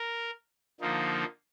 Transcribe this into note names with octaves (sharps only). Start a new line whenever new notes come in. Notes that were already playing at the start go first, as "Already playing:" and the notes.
Already playing: A#4
D3 F3 A#3 D#4